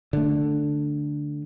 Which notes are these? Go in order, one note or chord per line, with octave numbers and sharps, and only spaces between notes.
D3 A3